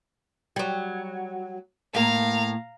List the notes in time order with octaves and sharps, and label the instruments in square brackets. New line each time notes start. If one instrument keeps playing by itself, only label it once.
[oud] F#3 G3
[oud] A2 A#3 [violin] F5 A#5